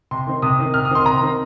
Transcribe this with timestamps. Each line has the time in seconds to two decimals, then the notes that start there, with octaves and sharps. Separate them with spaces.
0.11 C3 C6
0.27 D#3 C4
0.42 C3 D#6
0.58 D#3 C4
0.74 C3 F6
0.85 D#6
0.91 D#3 C4 C6
1.05 C3 A#5
1.21 D#3 C4